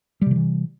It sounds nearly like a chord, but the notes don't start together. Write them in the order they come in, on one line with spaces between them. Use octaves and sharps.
G3 C3 D#3 E3